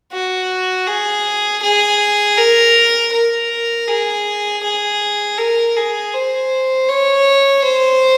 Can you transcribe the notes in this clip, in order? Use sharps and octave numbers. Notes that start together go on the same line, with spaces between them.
F#4
G#4
G#4
A#4
A#4
G#4
G#4
A#4
G#4
C5
C#5
C5